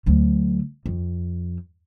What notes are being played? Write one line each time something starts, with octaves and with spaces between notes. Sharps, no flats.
D2 F#3
F2